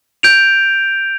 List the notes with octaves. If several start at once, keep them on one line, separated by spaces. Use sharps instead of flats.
G6 D7 F7